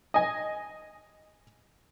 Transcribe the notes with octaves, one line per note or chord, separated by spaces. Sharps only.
D#5 G#5